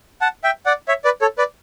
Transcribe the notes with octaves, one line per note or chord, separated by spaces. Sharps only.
F#5 A5
E5 G5
D5 F#5
C#5 E5
B4 D5
A4 C#5
B4 D5